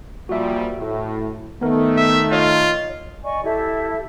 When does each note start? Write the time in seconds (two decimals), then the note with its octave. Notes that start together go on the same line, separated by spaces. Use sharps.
0.29 A#2 F3 G3 F#4 E5
0.78 A2
1.61 D#3 A3 B3 A#4
1.97 E5
2.32 F4 C#5 D#5
3.24 D5 D#5 G#5 C#6
3.44 E4 G4 A4 E5